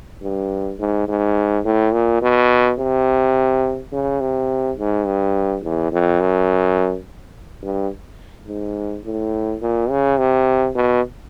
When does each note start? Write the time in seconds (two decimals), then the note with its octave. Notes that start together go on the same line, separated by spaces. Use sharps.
0.22 G2
0.79 G#2
1.08 G#2
1.65 A2
1.93 A#2
2.22 B2
2.79 C3
3.93 C#3
4.20 C3
4.77 G#2
5.06 G2
5.63 E2
5.92 F2
6.20 F#2
7.63 G2
8.48 G#2
9.04 A2
9.62 A#2
9.90 C#3
10.18 C3
10.75 B2